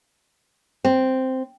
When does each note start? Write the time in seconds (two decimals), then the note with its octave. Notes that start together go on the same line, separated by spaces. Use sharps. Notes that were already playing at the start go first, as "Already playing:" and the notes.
0.85 C4